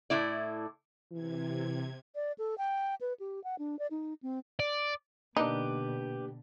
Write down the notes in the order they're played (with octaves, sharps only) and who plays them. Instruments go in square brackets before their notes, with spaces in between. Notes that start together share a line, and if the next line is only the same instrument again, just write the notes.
[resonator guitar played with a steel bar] A2 E4 D5
[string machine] C3 G#6 [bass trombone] E3
[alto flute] D5
A4
G5
B4
G4
F#5
D4
D5
D#4
C4
[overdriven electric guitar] D5
[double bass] B2 D3 [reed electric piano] A#3 D4 [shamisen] D#4 [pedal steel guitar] G4 B4